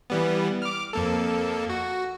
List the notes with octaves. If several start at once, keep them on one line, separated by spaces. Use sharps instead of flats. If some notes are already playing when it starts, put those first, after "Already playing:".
E3 G3 B3
D6 F6
F2 A#3 A4
F#4